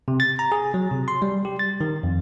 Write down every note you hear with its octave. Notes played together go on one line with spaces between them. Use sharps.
C3
A6
A#5
G#4
F#3
C3
C6
G3
G4
A6
D#3
F2